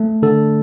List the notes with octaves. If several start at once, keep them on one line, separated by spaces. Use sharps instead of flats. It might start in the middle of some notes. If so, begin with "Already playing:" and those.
Already playing: A3
D3 A4